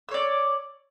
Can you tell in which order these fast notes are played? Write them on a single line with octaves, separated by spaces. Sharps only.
E6 C#5 D5